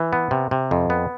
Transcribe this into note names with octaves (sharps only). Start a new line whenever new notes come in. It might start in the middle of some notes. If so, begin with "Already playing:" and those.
Already playing: E3
B3
C3
C3
F2
B3